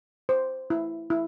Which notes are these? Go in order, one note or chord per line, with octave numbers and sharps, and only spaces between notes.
C5
E4
E4